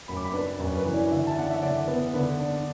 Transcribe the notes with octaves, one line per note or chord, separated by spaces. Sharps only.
F#2 B5
D6
B5
D4 B4
F#2
B4
E3
D5
D3 E5
A5
D4 F#5
E5
D3 D5
B3
D3 B4
D4